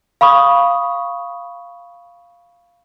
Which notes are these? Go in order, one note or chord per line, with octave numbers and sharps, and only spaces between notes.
F5 B5 C#6 D#6